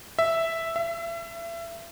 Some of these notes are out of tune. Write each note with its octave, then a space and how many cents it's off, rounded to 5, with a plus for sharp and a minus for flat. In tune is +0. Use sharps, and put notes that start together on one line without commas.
E5 +0
E5 +35